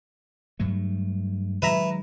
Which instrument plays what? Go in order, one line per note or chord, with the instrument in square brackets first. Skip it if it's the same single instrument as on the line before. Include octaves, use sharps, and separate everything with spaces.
[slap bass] G2 F#3 A3
[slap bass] D#3 F#3 G#3 [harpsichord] B4 E5 A#5